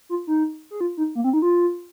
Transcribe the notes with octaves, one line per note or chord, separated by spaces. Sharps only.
F4
D#4
G#4
F4
D#4
A#3
C4
D#4
F4